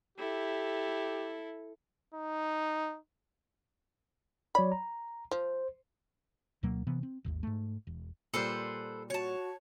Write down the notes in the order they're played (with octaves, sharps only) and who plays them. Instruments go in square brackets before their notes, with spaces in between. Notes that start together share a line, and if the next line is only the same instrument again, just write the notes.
[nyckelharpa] E4 A4 [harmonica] G4
[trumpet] D#4
[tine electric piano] F#3 C#5 D5 [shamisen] B5
[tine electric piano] A#5
[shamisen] F3 [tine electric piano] C5
[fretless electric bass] D2 B2 F#3 A#3
C3 E3 B3
C4
D1 G#1 D#2
G#2 A3
E1
[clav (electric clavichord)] A#2 G3 [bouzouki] A4 B4 C5
[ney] F#4 [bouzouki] C#5 A5